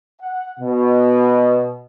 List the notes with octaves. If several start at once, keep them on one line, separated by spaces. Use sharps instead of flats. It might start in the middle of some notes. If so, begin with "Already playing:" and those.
F#5
B2